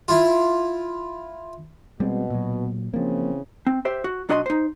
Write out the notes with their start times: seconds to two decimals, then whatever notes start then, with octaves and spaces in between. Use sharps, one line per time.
0.08 E4 F4
2.00 B2 G3 G#3 C4
2.30 A#2 F#3
2.94 C#3 E3 F3 A#3 C4
3.67 C4
3.85 G4 C5 E5
4.04 F#4
4.29 B1 D4 F#4 D#5 G#5 C6
4.46 D#4 C5